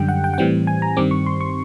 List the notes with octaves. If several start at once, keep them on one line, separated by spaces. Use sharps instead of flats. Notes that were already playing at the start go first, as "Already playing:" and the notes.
Already playing: F#2 D3 G3 G5
F#5
G5
F#5
A2 E3 G3 C4 G5
G#5
A#5
G2 D#3 G3 C4 D6
C#6
C6
C#6